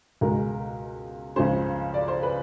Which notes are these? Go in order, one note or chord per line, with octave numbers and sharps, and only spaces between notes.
C#2 B2 G#3 A#4
C#2 C#3 F3 G#3 C#4 C5
D5
C5
B4